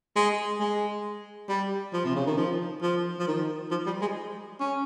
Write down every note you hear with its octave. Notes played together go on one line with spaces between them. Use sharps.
G#3
G#3
G3
F3
C3
C#3
D#3
F3
F3
F3
D#3
F3
G3
G#3
C#4